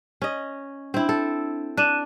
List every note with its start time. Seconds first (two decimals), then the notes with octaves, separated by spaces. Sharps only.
0.22 C#4 D#5
0.94 C4 D4 E4
1.09 A4
1.77 D4 F#6 D#7 E7